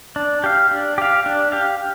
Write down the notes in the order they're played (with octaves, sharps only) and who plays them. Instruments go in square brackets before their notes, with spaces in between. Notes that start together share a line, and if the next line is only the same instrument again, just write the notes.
[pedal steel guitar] D4
G4 F5
D4
G4 F5
D4
G4 F5